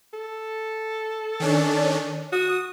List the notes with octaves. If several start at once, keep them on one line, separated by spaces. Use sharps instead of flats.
A4
D#3 C#4 D4
F#4 D#6